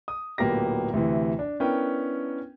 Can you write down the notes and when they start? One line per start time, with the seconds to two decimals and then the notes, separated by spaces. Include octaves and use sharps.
0.08 D#6
0.38 D1 A#2 A#3 B3 G4 A#6
0.93 D2 C3 E3
1.39 D4
1.60 B3 C#4 D4 E4 A#4 G5